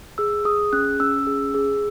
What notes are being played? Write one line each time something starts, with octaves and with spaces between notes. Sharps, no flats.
G#4 E6
G#4 D#6
C#4 F#6
C#4 E6
G#4
G#4